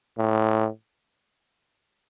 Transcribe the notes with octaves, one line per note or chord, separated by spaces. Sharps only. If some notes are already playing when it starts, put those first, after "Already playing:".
A2